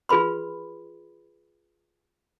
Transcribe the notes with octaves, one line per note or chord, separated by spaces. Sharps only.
F4 G#4 B4 B5 C6